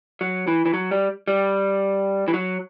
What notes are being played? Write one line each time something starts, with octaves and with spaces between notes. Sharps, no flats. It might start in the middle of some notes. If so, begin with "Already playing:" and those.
F#3
E3
E3
F#3
G3
G3
E3
F#3